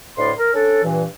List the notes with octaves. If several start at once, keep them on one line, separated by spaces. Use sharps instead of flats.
D2 A2 D5 C6
A#4
C#4 D4 A4
G2 A#2 E3